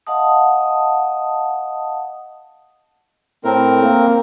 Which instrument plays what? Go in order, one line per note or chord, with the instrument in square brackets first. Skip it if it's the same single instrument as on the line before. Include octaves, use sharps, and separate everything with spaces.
[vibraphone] D#5 F5 F#5 A5 D#6
[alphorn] A2 [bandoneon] C4 A#4
[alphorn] A#3